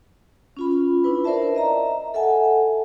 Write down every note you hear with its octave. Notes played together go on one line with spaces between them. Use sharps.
C#4 F4 B5
D4 E4 B4
A#4 C5 D5 E5 A5
D#5 E5 A#5
A4 E5 F#5 G#5 A5